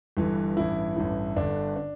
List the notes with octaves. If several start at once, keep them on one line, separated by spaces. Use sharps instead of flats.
G1 G2 E3
A1 G2 E3 E4
A1 G2 E3
G1 G2 D3 D4
D4